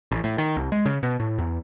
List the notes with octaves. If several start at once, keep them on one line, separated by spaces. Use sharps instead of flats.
A1
A2
D#3
C2
G#3
C#3
B2
A2
E2